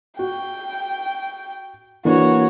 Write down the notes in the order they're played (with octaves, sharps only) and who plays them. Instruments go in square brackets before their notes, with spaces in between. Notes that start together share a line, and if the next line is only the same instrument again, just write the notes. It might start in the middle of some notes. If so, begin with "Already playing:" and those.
[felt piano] F#4 [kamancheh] G5
[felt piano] E3 A#3 D4 [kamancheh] F#4 C#5